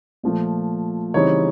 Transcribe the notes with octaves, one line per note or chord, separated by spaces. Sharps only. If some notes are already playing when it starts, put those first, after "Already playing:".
A#2 F3 A3
C#3 E3 G3 C4 D#4 C#5